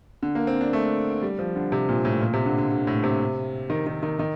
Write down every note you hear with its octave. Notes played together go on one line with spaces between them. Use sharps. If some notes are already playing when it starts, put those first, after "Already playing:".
D3
A#3
C4
D4
A3
G3
F3
D3
C3
A#2
A2
A#2
C3
D3
D3
D3
A2
C3
D#3
D#3
D#3
D#3